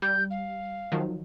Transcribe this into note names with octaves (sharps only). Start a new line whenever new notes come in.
G3 G6
F5
D#3 F3 F#3